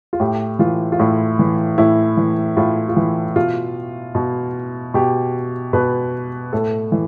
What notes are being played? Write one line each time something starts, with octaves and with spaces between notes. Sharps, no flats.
F4
A2 G4
E3 F4
F4
A2 E4
E3
A2 E4
E3
A2 F4
F4
E3 E4
B2 F4
B2
B2 G4
B2 B4
A2 A4
E3